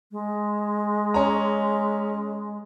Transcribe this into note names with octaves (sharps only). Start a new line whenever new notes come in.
G#3
C#4 A#5